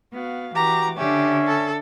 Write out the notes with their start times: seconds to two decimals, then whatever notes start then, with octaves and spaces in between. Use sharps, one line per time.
0.14 B3 F#4 F5
0.55 E3 F#4 G4 A#5 D6
0.98 D3 C#4 D4 G4 E5
1.47 A4